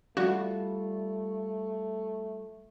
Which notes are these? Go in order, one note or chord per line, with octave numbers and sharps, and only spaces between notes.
G3 A3 D4 F4 F#4